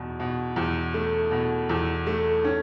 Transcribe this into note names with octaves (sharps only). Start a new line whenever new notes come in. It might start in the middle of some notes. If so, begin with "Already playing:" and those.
Already playing: E2 B2
B2
E2
A3
B2
E2
A3
C#4